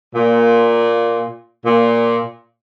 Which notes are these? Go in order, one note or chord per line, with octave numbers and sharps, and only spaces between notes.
A#2
A#2